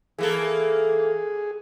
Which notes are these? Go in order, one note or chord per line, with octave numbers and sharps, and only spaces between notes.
E3 A#3 G#4 A4